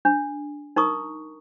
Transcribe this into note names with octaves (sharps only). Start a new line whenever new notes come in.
D4
D#4 A#4 A#5 C#6 D#6